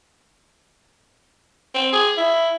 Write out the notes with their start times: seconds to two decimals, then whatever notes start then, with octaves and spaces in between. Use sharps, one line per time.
1.74 C4
1.93 G#4
2.17 E4